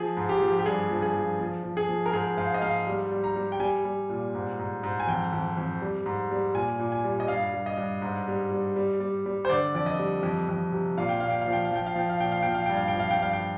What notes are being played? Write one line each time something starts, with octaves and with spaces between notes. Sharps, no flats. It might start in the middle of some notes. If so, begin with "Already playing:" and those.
Already playing: F3 G#4
G#2
G4
F3
G4
G2 G#4
F3
G#4
F3
F3
F3
G#4
F3
A#4
G#2 G#4
G#2 F5
D#5
G#2 F5
G3
G3
A#5
G3
G5
G3 G#5
G3
A#2
G#2
G#2
G#2
G#5
F2 G5
F2
F2
G3
G#2
G3
A#2 G#5
A#2
G#5
G3
D#5
G2 F5
G2
D#5
G2
G#2
G3
G3
G3
G3
G3
C5
D3 D5
F2 D5
D#5
G3
F2
F2
C3
A#2 F5
G5
A#2 F5
G5
F3 F5
G5
F5
F3 G5
F5
F3 G5
F5
A#2 G5
F5
F3 G5
F5
G2 G5
F5
F3 G5
F5
G5
G2 F5
G5